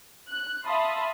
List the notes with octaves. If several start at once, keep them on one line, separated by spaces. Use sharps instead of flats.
F#6
E5 F5 A5 B5 C6 D#6